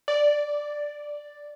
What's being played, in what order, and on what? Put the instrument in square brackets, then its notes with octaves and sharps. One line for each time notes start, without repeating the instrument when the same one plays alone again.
[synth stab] D5